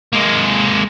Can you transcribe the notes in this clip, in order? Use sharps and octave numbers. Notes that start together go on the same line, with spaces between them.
G#3 A#3